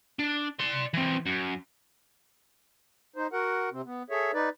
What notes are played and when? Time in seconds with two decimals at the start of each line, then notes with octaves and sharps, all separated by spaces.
0.19 D4
0.60 D5 C6
0.94 E3 C4
1.26 F#2
3.16 D#4 C5
3.33 F#4 A#4 F#5
3.72 C3 C4
3.85 B3
4.10 G#4 A4 C#5 E5
4.34 D#4 B4 D5